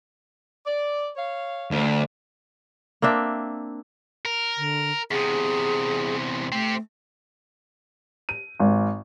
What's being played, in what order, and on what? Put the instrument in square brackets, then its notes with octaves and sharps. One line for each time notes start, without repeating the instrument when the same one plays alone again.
[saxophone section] D5
C#5 F5
[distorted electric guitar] D2
[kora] A#3 C4 D4 E5
[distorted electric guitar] A#4
[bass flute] D3
[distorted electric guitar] E2 C3 [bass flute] G#4
[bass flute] A3 [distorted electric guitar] C4 G4
[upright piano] D#7
G#1